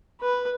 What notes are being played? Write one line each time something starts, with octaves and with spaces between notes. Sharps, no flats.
B4